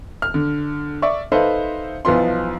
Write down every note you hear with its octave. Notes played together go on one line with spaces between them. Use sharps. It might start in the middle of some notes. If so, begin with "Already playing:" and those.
F6
D3
D5 E5 C#6
D#4 A4 B4 C5 E5 F5
B1 E3 F3 B3 F4 C6